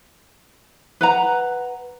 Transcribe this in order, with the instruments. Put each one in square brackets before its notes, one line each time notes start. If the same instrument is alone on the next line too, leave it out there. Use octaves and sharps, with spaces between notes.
[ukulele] B4 F#5 A#5